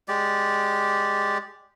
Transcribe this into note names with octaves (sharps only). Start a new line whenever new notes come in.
G#3 G4 D5